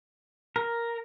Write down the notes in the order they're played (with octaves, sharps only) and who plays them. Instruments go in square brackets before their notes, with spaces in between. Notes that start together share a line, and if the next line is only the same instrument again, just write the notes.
[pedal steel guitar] A#4